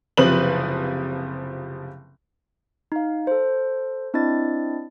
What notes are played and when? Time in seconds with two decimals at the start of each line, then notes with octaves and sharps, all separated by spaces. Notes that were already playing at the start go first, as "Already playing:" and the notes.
0.17 F#1 C3 F3 B4 F#7
2.92 D#4 F5
3.27 A4 C5
4.14 C4 D4 E4 D#5 A6